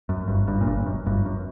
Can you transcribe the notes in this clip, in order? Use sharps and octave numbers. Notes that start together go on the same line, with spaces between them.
F#2
G1 G2
G1 G2
A#2
G1 G2
F#2
G1 G2
F#2